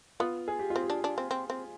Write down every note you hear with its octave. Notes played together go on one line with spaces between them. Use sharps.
B3 F4
G#4
G4
F4
C4
G4
D4
D4
C4
C4
C4